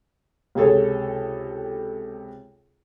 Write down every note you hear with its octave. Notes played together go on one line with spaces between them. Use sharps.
C#2 C3 G#4 A4 C#5